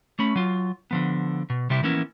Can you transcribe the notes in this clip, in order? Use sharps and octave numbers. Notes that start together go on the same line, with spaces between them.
A3 C#4 B5
F#3 F4
D3 F3 B3
B2
C3 G3 E4 G4
E3 F3 A#3 B3 C#4 E4